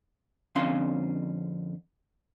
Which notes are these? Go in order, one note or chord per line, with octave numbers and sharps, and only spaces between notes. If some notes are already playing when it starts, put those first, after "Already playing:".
F2 D3 C4 C#4 F5 C6